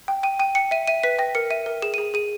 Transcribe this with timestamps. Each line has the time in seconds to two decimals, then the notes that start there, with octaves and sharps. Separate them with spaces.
0.08 G5
0.23 G5 D#7
0.39 G5 D#7
0.55 G5 C#7
0.71 E5 D#7
0.87 E5 D#7
1.03 B4 B6
1.19 G5 A#6
1.35 A#4 C#7
1.50 E5 D#7
1.66 A#4
1.82 G#4 E7
1.94 D#7
1.98 G#4
2.14 G#4 D#7